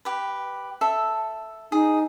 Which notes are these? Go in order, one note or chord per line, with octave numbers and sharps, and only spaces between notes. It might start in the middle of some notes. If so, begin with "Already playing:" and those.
G4 B4
A4 E5
D#4 G#4